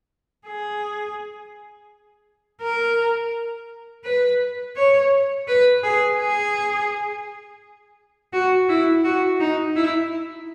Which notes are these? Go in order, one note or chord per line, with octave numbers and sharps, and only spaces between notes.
G#4
A#4
B4
C#5
B4
G#4
G#4
F#4
E4
F#4
D#4
E4